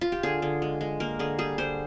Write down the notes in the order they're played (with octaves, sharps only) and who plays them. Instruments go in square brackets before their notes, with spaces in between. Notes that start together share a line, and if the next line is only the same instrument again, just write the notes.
[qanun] F4
G4
D3 G#4
D3
G#3
G#3
A#3 A#4
D3 G#4
G3 G#4
D3 C5